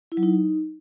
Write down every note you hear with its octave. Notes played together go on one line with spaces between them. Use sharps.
E4
F#3
D#4